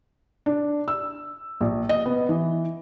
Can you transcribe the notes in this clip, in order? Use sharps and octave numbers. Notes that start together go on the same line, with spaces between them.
D4
E6
A#1
D#5
B3
E3